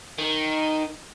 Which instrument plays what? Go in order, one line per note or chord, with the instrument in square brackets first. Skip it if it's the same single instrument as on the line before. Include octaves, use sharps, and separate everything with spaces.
[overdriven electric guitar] D#3